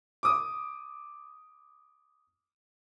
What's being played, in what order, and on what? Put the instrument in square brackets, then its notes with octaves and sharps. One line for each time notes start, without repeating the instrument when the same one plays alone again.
[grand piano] D6 D#6